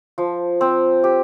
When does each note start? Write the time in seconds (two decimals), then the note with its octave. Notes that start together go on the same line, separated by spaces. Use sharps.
0.18 F3
0.61 C4
1.04 G4